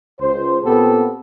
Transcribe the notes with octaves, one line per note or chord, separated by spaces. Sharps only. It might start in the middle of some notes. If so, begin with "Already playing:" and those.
C#2 C5
A#2 B3 C4 G4 A4